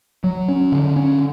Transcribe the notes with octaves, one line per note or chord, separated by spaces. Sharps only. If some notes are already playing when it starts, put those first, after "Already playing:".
F#3
C#4
D3
C#4